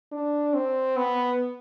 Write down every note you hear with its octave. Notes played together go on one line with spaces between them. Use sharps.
D4
C4
B3